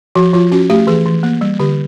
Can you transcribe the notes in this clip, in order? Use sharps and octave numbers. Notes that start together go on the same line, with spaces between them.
F3 F#4
F3 F4
C#4 F#4
A3 G4
E3 G#4
E3
A#3
G3
D3 G4